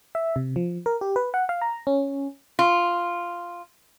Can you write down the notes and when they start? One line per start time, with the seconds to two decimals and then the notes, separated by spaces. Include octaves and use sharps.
0.15 E5
0.36 C3
0.56 F3
0.86 A#4
1.01 G4
1.16 B4
1.34 F#5
1.49 F5
1.62 A#5
1.87 C#4
2.59 F4